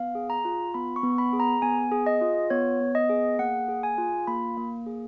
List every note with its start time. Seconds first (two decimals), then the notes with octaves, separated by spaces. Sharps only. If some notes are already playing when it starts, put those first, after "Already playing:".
Already playing: B3 F5
0.15 G#4
0.30 A#5
0.45 F4
0.74 B3 B5
0.96 C#6
1.03 B3
1.18 B5
1.33 G#4
1.40 A#5
1.62 B3 G#5
1.92 G#4
2.06 D#5
2.21 F4
2.50 B3 C#5
2.81 B3
2.95 D#5
3.09 G#4
3.39 A#3 F#5
3.68 G#4
3.83 G#5
3.98 F4
4.27 A#3 B5
4.57 A#3
4.86 G#4